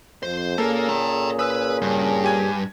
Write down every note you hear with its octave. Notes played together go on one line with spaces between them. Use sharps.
F2 C5
A#2 A#3 C#4 G#4 A4
G5 A#5
B4 D#6 E6
G2 C#3
G4 G#5 G#6